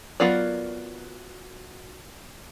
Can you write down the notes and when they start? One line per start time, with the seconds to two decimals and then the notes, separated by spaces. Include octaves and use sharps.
0.20 F#3 B3 F4 A#4 D5